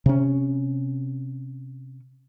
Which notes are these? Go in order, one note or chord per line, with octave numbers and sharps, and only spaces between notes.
C3 C#4